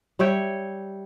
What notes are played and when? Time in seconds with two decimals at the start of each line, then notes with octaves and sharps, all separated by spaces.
0.19 G3 C#5 E5 G5